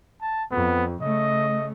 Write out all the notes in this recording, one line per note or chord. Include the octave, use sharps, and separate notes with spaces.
A5
F2 B3
C#3 A3 D#5